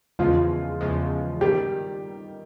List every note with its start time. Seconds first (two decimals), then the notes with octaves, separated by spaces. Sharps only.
0.19 E2 C#3 F3 G#3 F4
0.81 E2 C#3 F3 G#3
1.41 D#3 G3 G4